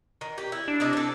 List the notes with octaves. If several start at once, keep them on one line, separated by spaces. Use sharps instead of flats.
D#3
G4
E4
D4
C3 E4 D#5
C4 A4